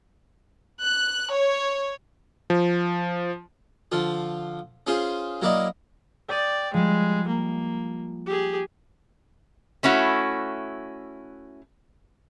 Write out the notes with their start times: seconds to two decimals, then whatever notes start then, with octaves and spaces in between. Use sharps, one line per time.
0.81 F#6
1.32 C#5
2.50 F3
3.92 D3 F3 F4
4.87 C#4 F4 G#4 C5
5.42 F#3 A#3 E4 A#4 D5 D#5
6.29 D5 G5 C#6 D#6
6.74 F3 G3 G#3
7.28 A#3
8.26 G4 G#4
9.83 A3 C#4 E4 F#4